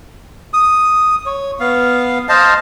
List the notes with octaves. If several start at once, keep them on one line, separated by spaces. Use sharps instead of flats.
D#6
C#5
B3 F5
C5 D#5 F5 A5